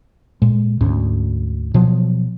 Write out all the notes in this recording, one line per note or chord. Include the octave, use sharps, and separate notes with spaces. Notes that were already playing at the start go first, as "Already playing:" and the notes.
A#2 G#3
D2 G#2 C#4
B2 F3 F#3